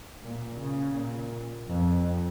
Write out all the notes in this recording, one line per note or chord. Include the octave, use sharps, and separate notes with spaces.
A#2
C#3
A#2
F2